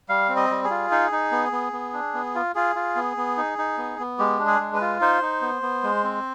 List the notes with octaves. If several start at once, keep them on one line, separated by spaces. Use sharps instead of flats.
G3 F5
C4
D#5
G3
G#4
F4
D#4
D#4
B3
B3
B3
D4
B3
F4
F4 G#4
F4
B3
B3
D#4
D#4
B3
B3
G#3 G4
D4
G#4
G#3
B4
F4
D#4 C5
D#4
B3
B3
G#3
C4